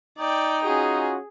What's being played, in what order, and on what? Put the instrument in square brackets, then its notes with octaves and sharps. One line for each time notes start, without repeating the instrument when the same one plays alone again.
[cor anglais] D#4 [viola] D5 G5
[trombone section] C#4 F4 F#4 [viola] G#4